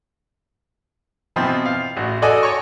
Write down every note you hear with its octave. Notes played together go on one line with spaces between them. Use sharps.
B2 E3 F3 C4
F5
A1 F#4
F#4 A4 D5 D#5 G#5
C#5 C#6